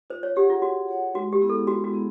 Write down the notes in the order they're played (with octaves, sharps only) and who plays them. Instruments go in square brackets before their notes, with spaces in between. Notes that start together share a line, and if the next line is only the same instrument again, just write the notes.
[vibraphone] F4 [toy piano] C5
[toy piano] C#5
[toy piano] G4 [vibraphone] G#4 C#5 F#5
[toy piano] F4
[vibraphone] F4 [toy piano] F#4
[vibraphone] G#4 C#5 F#5
[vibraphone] G#3 [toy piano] F#4
[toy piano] G4
[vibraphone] B3 E4 G#4
[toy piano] A4
[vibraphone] G#3 [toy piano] F#4
[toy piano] F#4
[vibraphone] B3 E4 G#4